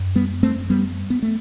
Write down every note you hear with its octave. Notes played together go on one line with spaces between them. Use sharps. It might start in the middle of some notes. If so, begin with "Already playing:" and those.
Already playing: F#2
G3 B3
A3 C4
G3 B3
B3
A3